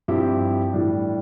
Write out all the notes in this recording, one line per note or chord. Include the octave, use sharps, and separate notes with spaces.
G2 F3 C4 E4 G4
A2 E3 G3 D4